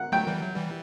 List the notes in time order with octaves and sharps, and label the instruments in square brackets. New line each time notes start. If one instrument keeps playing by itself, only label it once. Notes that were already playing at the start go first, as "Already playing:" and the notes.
Already playing: [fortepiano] F#5
[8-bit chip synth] F#3 A3 [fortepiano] G5
[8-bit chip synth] E3 G3
F#3
E3 G3